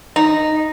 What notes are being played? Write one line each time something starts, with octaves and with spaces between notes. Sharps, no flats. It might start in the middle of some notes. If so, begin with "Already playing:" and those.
D#4